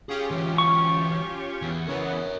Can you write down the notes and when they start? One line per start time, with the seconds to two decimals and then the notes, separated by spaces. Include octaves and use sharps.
0.09 C#4 F4 G4 G#4
0.31 E3 F#3
0.58 C#6
1.62 E2
1.87 C#3 E3 B3 A#4 C#5